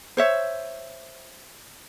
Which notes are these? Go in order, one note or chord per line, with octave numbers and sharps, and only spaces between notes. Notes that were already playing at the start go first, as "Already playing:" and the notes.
C5 C#5 E5